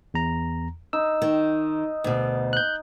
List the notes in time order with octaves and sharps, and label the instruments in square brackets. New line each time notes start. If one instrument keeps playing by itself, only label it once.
[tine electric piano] E2 A#5
[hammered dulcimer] D#4 [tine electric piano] E6
[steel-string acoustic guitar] D#3
D2 B2
[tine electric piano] F#6 G6